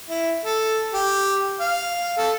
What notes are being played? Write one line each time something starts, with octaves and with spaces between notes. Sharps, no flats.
E4
A4
G4
F5
A4